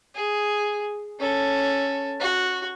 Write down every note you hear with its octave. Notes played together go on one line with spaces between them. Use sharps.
G#4
C#4 A4
F#4